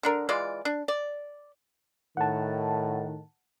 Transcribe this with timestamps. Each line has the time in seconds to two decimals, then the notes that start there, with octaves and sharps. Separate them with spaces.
0.03 D3 D4 A#4
0.29 E3 G#3 F4 D5
0.65 D4
0.88 D5
2.17 A2 D#3 F#5 A5